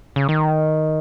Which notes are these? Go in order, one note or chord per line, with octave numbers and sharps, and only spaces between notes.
C#3
D#3